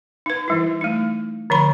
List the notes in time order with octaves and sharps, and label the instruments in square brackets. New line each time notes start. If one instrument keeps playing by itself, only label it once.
[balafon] D#4 B4
E3 G3 E4
A3 D#4
D3 F3 B5